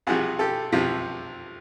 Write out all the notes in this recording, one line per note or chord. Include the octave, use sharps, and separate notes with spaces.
C2 C3 F3 F#4 G#4
G4 A4
C2 C3 F3